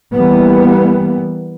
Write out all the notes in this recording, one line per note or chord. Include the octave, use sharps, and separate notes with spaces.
E3 G3 A#3 B3